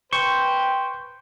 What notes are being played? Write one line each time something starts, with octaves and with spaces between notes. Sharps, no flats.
B4 C5 G5 C#6